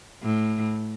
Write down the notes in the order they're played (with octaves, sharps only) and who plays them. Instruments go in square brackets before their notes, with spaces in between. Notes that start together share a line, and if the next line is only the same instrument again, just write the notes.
[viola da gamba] A2